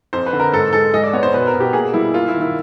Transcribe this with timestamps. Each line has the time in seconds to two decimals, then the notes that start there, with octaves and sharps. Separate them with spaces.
0.13 F2 C5
0.26 B4
0.33 D3
0.40 A#4
0.53 G#2 A4
0.73 G#3 A4
0.94 G#3 D#5
1.04 D5
1.13 B3 C#5
1.23 C5
1.34 B2 B4
1.47 A#4
1.54 B2
1.60 G4
1.73 A#3 G#4
1.93 G3 E4
2.14 A#3 F4
2.28 E4
2.34 D#3
2.42 E4